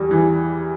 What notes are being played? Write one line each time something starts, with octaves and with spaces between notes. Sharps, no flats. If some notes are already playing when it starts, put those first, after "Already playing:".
Already playing: E2 G3
E3